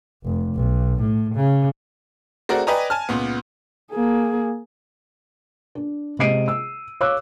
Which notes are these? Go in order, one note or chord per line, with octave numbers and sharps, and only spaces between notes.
F1
B1
A2
C#3
A3 C4 F#4 G#4 A#4 D5
B4 D5 D#5 G5 G#5 A#5
G#5 A5 F6
C#2 A#2 B3
A#3 G#4
D4
C3 G#3 D#5 C7 D7 D#7
E6
C#5 F5 D6 E6 F#6